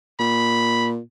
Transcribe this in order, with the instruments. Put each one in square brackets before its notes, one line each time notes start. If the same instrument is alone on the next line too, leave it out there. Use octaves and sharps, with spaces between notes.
[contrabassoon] A#2 [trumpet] B5